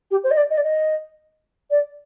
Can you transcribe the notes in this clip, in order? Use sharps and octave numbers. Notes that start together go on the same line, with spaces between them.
G4
C5
D#5
D5
D#5
D5
D#5
D5